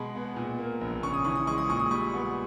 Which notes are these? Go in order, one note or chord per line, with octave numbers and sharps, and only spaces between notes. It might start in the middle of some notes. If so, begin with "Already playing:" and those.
Already playing: B2 G#3 B5
B3
A#2
A#3
A#1
C#3 C#6
D#6
E3 C#6
D#6
G#3 C#6
D#6
A#2 C#6
D#6
G3 C#6
B3